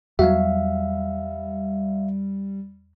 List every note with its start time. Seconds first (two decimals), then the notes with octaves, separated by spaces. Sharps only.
0.19 E2 F#3 G3 F#4 E5 F5